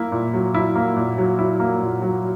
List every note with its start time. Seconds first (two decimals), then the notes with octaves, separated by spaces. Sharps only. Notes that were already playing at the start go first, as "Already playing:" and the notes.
Already playing: A#3 E4
0.12 A#2
0.34 F#3
0.54 E4
0.75 A#3
0.96 A#2
1.18 F#3
1.39 E4
1.60 A#3
1.82 A#2
2.02 F#3